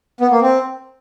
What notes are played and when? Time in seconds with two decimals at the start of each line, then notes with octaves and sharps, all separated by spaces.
0.20 B3
0.31 A#3
0.42 C4